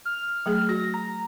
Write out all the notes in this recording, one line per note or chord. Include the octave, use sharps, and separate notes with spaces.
F6
F#3 A3 G#4
F#4 A#6
A#5